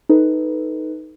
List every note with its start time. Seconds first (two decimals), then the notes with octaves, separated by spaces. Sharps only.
0.09 D#4 A4 B4